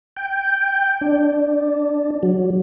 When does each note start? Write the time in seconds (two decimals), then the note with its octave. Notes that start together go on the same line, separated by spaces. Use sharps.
0.16 G5
1.01 D4
2.23 F#3